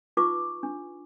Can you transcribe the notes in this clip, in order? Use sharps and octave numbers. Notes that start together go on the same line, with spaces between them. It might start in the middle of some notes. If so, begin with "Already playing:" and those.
D#4 F4 B4 C#6 D6
D4